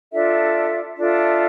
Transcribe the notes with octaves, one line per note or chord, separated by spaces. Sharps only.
D4 F4 A4 E5
D4 F4 A4 E5